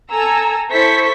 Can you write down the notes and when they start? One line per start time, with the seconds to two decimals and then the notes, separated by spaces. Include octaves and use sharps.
0.10 A4 G#5 A#5 E6
0.72 E4 A4 C5 C#6 B6